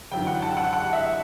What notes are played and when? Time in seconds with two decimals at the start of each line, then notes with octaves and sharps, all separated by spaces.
0.11 G1 F#2 E3 G5
0.27 F#5
0.42 A5
0.57 F#5
0.73 F#5
0.93 E5